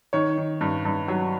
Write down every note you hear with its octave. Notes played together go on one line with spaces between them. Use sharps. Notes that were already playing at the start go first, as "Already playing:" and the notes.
D#3 C#5
D#3
G2
G2
F#3